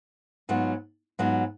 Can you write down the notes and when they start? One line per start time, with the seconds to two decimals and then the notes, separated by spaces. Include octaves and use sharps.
0.49 G#2 F#3 B3 F4
1.19 G#2 F#3 B3 F4